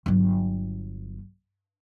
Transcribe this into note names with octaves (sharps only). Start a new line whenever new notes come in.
G1 F#3